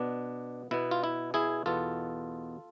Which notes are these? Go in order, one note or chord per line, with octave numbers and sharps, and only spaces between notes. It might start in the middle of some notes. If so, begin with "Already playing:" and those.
Already playing: B2 B3 D4
B2 B3 E4
F4
E4
E4 G#4
E2 B2 B3 F4 A4